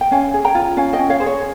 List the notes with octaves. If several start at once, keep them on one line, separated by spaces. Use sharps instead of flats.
G5
C#4 F5 G#5
G#4
G5 A#5
F4
C#4 F5 G#5
D#5 G5
C#4
C#5 F5
G#4 C5
C#5